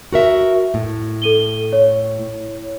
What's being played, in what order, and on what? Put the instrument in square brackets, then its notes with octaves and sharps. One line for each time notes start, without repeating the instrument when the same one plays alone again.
[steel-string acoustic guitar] F#4 A#4 E5
A2
[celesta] A4 D#7 G7
C#5